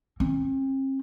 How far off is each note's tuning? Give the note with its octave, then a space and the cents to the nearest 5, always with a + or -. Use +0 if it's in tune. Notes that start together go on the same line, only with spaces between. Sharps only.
C4 +45